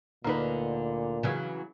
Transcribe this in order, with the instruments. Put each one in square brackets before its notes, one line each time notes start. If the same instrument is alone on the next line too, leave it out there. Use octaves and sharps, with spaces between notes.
[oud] D2 D3 [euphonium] A#2 [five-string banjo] A#3 D#4 B4
[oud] C#3 E3 F#3